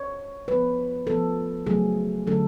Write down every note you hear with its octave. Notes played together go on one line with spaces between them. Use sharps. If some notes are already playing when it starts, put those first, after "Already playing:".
Already playing: C#5
F3 B3 B4
F3 B3 A4
C#3 F#3 A3 G#4
D3 F#3 A3 C#4 A4